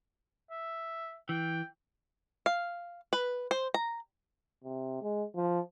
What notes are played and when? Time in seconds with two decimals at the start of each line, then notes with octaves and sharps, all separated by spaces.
0.51 E5
1.29 E3 G5
2.46 F5
3.13 B4
3.51 C5
3.74 A#5
4.64 C3
5.02 G#3
5.35 F3